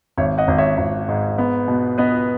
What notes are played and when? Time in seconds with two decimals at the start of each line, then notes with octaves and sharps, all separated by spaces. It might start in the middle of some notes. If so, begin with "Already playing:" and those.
0.17 G#1 C#5 E5
0.38 D#5 F#5
0.48 G#1
0.58 C#5 E5
0.78 G#1
1.09 G#2
1.38 B3
1.68 B2
1.98 B3 B4 D#5